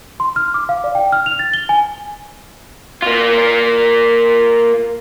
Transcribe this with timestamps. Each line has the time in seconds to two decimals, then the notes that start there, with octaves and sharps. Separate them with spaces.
0.20 C6
0.36 F6
0.54 D6
0.69 F5
0.84 D5
0.95 G5
1.12 F6
1.26 F7
1.39 A6
1.54 G7
1.69 G#5
3.02 A#3 F4